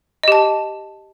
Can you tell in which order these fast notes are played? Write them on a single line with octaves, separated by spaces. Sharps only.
D#5 G4 A5